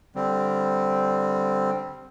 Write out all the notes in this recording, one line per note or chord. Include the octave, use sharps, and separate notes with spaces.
D3 G3 C4